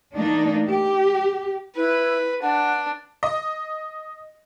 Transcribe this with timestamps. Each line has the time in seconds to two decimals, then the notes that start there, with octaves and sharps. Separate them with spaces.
0.15 E3 A3 A#3 D4 D#4
0.68 G4
1.76 E4 B4
2.42 D4 F#5
3.23 D#5